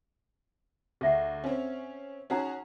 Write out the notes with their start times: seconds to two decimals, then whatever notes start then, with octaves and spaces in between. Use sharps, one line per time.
1.01 D2 G#4 E5 F#5
1.44 C4 C#4
2.30 C#4 D#4 F#4 G#4 F#5 A#5